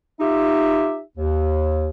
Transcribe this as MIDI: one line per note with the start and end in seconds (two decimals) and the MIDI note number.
0.20 1.01 63
0.20 1.01 65
0.20 1.01 67
0.20 1.01 76
1.18 1.89 39